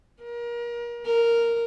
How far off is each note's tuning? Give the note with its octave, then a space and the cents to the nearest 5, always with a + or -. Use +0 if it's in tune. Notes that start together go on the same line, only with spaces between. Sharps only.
A#4 +30
A#4 -5